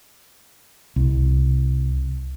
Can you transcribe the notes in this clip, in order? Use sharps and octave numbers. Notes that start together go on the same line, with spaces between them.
C2